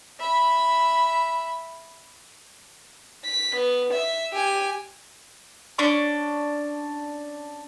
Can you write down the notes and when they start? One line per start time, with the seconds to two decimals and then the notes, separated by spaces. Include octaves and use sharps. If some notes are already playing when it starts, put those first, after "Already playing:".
0.20 E5 B5
3.25 B6
3.56 B3
3.93 E5
4.33 G4 G#5
5.78 C#4 D4 C#6